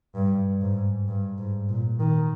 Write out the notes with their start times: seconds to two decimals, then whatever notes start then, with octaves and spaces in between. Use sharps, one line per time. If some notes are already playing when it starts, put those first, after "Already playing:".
0.15 G2
0.62 G#2
1.08 G2
1.38 G#2
1.69 A#2
2.00 D#3